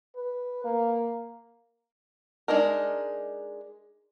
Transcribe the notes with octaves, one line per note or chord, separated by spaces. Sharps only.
B4
A#3
G#3 D4 D#4 A#4